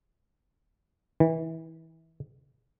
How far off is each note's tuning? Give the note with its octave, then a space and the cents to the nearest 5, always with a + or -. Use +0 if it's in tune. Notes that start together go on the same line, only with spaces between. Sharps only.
E3 -25